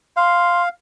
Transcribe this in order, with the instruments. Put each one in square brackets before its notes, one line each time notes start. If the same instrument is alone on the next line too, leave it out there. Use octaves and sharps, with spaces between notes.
[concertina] F5 [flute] C6